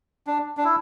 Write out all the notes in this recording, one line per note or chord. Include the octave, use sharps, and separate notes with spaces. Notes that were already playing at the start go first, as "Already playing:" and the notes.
D4
D4
E4